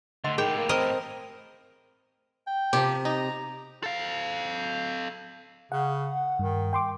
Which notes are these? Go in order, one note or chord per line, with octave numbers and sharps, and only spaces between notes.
D2 D3 D#5 F#5 C6
A2 D#3 G4 G#4 G5
A#3
C4 A#4 D#5
G5
C3 F3 G4
D#4 A#5
A4 F5
C#3 F#5
G2 D#3
G5 C6 D6